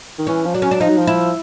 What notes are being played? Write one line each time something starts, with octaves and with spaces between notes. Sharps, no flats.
D#3
E3 C#4
F3
F#3 D4
C#4
D4
F3 D#4
F#3
F3
E4